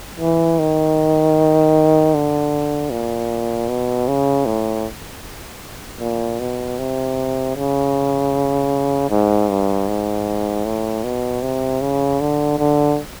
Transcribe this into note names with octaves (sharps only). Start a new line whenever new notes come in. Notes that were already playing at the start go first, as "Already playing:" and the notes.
E3
D#3
D3
A#2
B2
C#3
A2
A#2
B2
C3
C#3
G#2
G2
G#2
A2
B2
C3
C#3
D3
D3